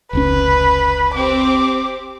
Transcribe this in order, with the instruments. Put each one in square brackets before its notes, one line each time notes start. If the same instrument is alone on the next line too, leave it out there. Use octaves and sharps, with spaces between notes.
[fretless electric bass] F1 C#2 C#4 [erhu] B4
[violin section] C4 G4 [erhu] D6